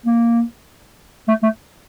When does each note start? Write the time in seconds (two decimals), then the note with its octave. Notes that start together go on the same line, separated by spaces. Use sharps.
0.06 A#3
1.28 A3
1.43 A3